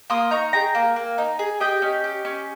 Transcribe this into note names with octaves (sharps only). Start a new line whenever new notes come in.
A#3 C6 D#6
D#4 A#5 C#6
G#4 G5 A#5
A#3
A#3
D#4
G#4
G4 D#5 G5
C#4
G4
C#4